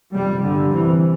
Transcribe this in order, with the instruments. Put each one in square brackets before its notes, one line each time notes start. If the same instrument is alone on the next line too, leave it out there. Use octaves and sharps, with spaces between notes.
[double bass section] G1 F2 C3 G3
G1 G2 D3
C2 C3 E3